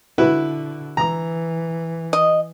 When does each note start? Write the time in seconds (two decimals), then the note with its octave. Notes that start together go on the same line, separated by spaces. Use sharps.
0.18 D3 E4 F#4 B4
0.97 E3 A#5
2.13 D#5